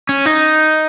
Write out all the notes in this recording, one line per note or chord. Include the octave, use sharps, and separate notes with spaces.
C#4
D#4